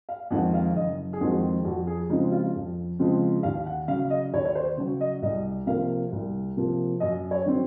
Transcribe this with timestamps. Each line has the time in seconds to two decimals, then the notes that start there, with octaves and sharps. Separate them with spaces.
0.09 F5
0.31 F2 D#3 G#3 C4 F#5
0.54 F5
0.76 F#1 D#5
1.13 G#4
1.21 F2 D#3 G#3 C4 F#4
1.65 F2 F#4
1.87 G#4
2.09 C#3 F3 G#3 C4 D#4
2.32 F4
2.55 F2
2.99 C#3 F3 G#3 C4
3.43 D#2 F5
3.66 F#5
3.88 C#3 F#3 F5
4.10 D#5
4.33 D#2 C#5
4.45 C#5
4.55 C5
4.77 C#3 F#3
5.01 D#5
5.22 C2 D#5
5.66 C3 F3 A#3 F5
6.12 C2
6.57 C3 F3 A#3
7.00 F#2 D#5
7.31 C#5
7.46 D#3 F#3 C4